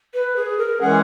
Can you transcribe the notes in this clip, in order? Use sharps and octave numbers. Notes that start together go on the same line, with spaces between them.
B4
G#4
A#4
E3 G#3 C#4 G#4 F#5